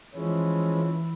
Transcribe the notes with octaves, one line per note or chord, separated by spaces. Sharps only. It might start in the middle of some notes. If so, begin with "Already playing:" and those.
E3 F3 G#3 C#4